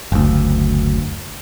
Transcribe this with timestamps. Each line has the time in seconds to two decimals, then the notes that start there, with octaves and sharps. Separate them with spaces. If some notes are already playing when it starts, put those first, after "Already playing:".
0.12 F#1 D2